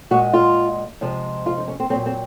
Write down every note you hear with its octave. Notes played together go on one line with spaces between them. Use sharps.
A#2 G#3 F#4
F4
C3 F3 G#3
F4
D#4
C#4
C4
A#2 F#3 C4
C4